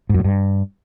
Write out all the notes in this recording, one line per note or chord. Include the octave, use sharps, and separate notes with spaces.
G#2
F#2
A2
G2